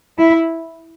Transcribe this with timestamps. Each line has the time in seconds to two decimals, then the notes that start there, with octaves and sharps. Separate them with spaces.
0.18 E4